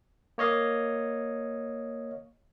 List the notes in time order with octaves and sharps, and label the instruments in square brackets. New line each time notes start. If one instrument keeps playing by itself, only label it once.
[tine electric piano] A#3 C#5 D#5 F5